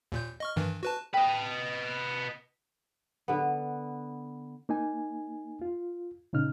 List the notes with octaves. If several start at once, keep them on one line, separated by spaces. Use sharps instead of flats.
D#2 A#2 G6
D#5 C#6 F6
G2 D#3 E3
F#4 B4 A5
B4 D#5 G5
D3 B3
A#3 D#4 G#5
F4
A#2 C#3 D#4 F6